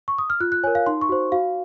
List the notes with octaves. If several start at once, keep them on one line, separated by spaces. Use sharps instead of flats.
C#6
D#6
F6
F4 F#6
F#6
A#4 C#5 G#5
F5
D#4 C6
C#6
F#4 C5
F#4 F5